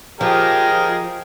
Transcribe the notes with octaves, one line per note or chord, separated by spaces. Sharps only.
F3 G4 G#4 A#4 D#5